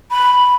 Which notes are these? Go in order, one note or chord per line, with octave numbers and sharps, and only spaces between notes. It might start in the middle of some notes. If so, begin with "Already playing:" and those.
B5